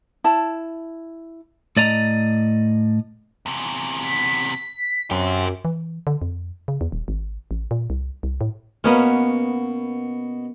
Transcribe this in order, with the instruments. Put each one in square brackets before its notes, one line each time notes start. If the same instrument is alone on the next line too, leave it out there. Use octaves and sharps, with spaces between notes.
[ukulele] E4 A5
[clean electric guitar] A2 D5 D#5 A#5
[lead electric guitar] E2 C3
[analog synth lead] B6
[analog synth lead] F#2 [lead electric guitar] G4 C5
[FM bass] E3
D3
F2
C#3
E2
D#1
G#1
A1
A#2
C2
C2
A2
[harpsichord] B2 [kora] A#3 B3 C#4